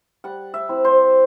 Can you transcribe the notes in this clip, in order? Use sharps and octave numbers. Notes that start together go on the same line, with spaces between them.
G3 F#5
E5
C4 E4
C5